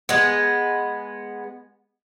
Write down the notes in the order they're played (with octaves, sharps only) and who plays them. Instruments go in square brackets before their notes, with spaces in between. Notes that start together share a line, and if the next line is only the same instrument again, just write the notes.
[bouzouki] G#3 B3